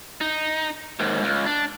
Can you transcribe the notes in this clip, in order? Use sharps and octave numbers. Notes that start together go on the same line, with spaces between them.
D#4
D#2 G#2
C#2
D4